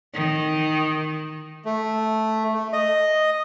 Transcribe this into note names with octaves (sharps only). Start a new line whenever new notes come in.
D#3
A3
A3
D#5